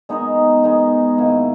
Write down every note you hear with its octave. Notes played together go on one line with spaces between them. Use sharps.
G#3 B3 D#4 A#4
G#3 B3 D#4 A#4
G#2 D#3 A#3 E4